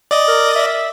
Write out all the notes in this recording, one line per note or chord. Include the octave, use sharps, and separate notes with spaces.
D5 D#5
A#4
E5